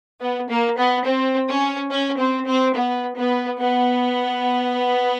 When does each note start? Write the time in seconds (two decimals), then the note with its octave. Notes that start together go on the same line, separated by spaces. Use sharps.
0.20 B3
0.49 A#3
0.77 B3
1.05 C4
1.48 C#4
1.90 C#4
2.19 C4
2.47 C4
2.75 B3
3.17 B3
3.60 B3